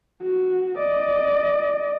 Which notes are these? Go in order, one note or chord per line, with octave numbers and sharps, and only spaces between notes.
F#4
D5 D#5